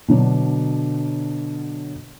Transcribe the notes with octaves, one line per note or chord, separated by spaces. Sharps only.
B2 D3 F#3 D4